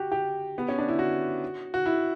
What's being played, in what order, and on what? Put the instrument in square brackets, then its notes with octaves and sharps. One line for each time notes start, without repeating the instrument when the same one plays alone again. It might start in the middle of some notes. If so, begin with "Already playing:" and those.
Already playing: [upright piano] F#4 G4
G4
B3
C#4
D4
E4
F#4
F#4
E4